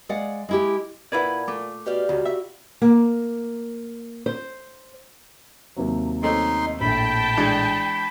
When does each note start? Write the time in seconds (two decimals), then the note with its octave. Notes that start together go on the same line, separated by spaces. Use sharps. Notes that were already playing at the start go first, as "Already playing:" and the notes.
0.09 G#3 D5 F5 F#5
0.49 G#3 E4 G4
1.12 A#2 E4 B4 D5 F#5 B5 G#6
1.48 A3 D6
1.86 B2 G4 D5 F5
2.09 C#2 F4 F#4
2.25 E5
2.82 A#3
4.26 C5
5.76 D#2 C3 F#3
6.23 A3 C4 C#4 D#4 C6
6.81 A#1 A2 G5 A5 B5
7.37 E3 G#3 D4